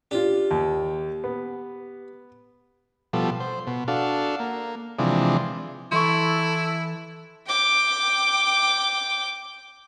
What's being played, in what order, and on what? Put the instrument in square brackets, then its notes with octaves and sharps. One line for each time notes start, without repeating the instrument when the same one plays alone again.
[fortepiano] D4 F4 [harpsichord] G4
[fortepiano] D#2
B3
[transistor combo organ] B2 F3 G3 A4
C5
B2
D4 F#4 A4 F5
A#3
C3 E3 F3 G#3 D4
[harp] E3 [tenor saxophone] E4 [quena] A4 [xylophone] C6 C#6
[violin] G5 D6